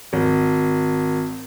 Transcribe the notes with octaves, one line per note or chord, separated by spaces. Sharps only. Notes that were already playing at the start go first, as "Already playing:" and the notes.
G#1